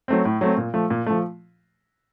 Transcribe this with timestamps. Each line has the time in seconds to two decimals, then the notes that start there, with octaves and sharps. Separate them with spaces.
0.08 F#3 A3 C4
0.25 A2
0.41 F#3 A3 C4
0.57 A#2
0.74 F3 A3
0.90 A#2
1.06 F3 A3